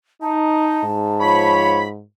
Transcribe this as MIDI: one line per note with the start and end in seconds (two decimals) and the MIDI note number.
0.22 0.82 63
0.22 1.53 81
0.84 2.03 44
1.20 1.84 53
1.20 1.84 65
1.20 1.84 73
1.20 1.87 83